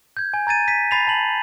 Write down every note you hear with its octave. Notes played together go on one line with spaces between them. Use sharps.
G6 G#6
G#5
A#5 G#6 A6 D#7
B6 D#7
B5 A6 B6 C7 F7
A5 F#7